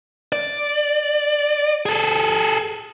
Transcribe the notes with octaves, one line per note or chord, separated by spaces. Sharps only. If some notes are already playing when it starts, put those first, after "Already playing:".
D5
G#4 A4